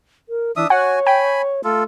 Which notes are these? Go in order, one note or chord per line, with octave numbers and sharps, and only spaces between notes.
A#4
E3 D4 E5 D#6
F#4 C#5 F#5 G#5
G5 G#5 B5
A3 F4 A4